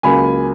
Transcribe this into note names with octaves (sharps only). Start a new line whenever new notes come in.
C#2 C#3 F#3 A#3 G#5 B5